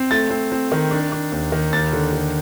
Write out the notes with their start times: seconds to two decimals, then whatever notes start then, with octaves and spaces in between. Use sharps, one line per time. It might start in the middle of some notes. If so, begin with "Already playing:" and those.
Already playing: C4
0.11 A3 A6
0.30 C4
0.52 C4
0.72 D#3
0.91 D4
1.12 D4
1.32 D#2
1.52 D#3
1.73 D#2 A6
1.93 D3
2.13 D3